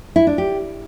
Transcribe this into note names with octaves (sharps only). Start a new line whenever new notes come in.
E4
D4
G4